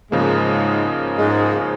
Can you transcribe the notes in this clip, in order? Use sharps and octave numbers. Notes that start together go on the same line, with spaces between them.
G#2 C#3 F3 G#3 A#3
G#2 G#3